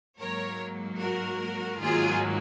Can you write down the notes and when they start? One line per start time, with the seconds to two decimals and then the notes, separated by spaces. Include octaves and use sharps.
0.20 G#2 F#3 A#3 A#4 C#5
1.00 F#4 A#4
1.80 G#2 D#3 F#3 A#3 F4 G#4